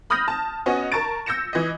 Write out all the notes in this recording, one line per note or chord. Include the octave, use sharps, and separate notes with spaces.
B5 D#6 F6 G6 A#6
A5
B3 C#4 F#4 D#5
A#4 A5 C#6 A6 D7
E6 G6 A#6 C#7 E7
E3 D#5